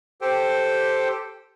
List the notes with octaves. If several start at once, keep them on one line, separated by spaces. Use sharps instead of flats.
G4 A4 C5 G5